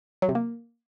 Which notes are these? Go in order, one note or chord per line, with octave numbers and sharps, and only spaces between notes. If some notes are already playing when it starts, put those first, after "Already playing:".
F#3
C3
A#3